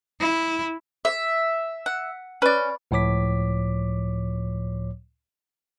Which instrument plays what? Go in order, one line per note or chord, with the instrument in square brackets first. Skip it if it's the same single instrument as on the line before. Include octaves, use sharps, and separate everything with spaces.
[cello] E4
[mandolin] E5
[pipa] F#5
[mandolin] C#4 [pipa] B4 D5
[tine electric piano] C#2 A2 F3 C#5 D6 B6